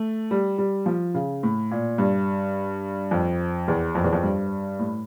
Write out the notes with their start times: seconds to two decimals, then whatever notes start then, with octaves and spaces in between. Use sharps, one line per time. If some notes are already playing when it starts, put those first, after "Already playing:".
Already playing: A3
0.31 G3
0.58 G3
0.86 F3
1.14 C#3
1.43 A2
1.71 A#2
1.98 G2
3.11 F2
3.68 E2
3.95 F2
4.04 E2
4.13 F2
4.23 G2
4.79 A2